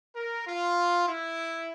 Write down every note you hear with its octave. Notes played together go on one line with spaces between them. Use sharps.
A#4
F4
E4